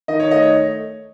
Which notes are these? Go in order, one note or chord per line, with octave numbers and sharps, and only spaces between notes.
D#3 D#5
C#5
A3 D#5
C#5